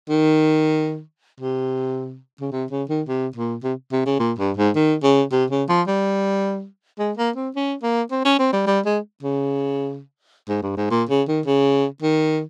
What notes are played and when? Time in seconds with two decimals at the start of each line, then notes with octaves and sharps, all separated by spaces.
0.10 D#3
1.40 C3
2.41 C#3
2.52 C3
2.71 C#3
2.89 D#3
3.08 C3
3.36 A#2
3.64 C3
3.92 C3
4.06 C#3
4.20 A#2
4.39 G2
4.57 G#2
4.75 D#3
5.03 C#3
5.32 C3
5.50 C#3
5.69 F3
5.88 G3
6.99 G#3
7.17 A#3
7.36 C4
7.55 C#4
7.83 A#3
8.11 C4
8.25 C#4
8.39 C4
8.53 G3
8.67 G3
8.86 G#3
9.23 C#3
10.49 G#2
10.62 G2
10.77 G#2
10.91 A#2
11.09 C#3
11.28 D#3
11.46 C#3
12.02 D#3